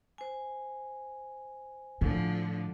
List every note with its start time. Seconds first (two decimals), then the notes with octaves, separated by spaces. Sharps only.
0.18 C5 G#5
2.01 A2 D3 F3